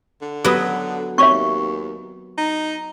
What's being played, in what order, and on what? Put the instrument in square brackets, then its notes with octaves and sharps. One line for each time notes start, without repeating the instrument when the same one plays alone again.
[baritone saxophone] D3
[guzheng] F#3 B3 [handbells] G4 B4 D#6
[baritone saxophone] D#2 [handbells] C4 C#5 E5 [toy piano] C#6
[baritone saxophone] D#4